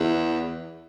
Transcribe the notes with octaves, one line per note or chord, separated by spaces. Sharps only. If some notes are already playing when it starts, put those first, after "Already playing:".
Already playing: E2